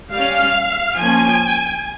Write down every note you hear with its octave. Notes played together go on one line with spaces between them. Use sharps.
G3 C#4 F5
F3 A#3 C#4 G#5